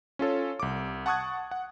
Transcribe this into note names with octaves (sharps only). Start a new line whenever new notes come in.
C#4 F4 A4 C#5
C2 D6
F#5 A5 C#6 D#6 F#6 G#6
F#5